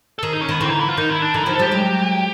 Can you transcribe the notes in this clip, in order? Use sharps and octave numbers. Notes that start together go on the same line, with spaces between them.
A4
D#3 G#4
D#4
C#4
D#3 B3
D3 E3 C4
D#4
E4
F4
D#3 D#4
E4
D4
D3 E3 D#4
D#3 F3 E4
A4
F3 G3 G4
F#3 G#3